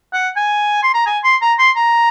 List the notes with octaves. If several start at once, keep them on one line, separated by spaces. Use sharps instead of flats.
F#5
G#5
C6
A#5
G#5
C6
A#5
C6
A#5